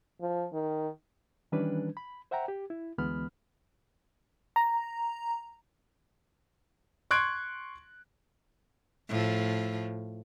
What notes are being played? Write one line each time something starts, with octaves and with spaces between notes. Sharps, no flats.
F3
D#3
D#3 E3 G3 C#4 D4 B4
B5
C5 E5 F#5 G5 A#5
G4
E4
D2 E3 G#3 B3 B5 F6
A#5
C6 C#6 F#6 G#6 D7
A2 F3